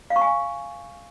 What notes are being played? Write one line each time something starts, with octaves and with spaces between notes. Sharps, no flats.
F5
C#6
G#5